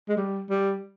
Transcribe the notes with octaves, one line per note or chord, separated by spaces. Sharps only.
G#3
G3
G3